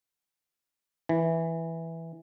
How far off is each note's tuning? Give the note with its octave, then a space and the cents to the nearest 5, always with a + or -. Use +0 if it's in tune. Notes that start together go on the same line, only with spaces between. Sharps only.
E3 -5